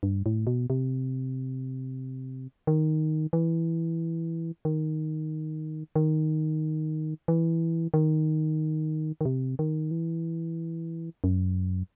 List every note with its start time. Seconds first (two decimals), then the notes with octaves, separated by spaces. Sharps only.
0.03 G2
0.26 A2
0.47 B2
0.70 C3
2.67 D#3
3.33 E3
4.65 D#3
5.96 D#3
7.28 E3
7.94 D#3
9.21 D#3
9.25 C3
9.59 D#3
9.91 E3
11.24 F#2